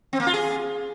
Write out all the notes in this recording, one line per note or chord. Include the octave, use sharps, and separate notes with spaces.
C4
A#3
F4
G#4